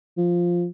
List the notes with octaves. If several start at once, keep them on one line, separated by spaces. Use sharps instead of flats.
F3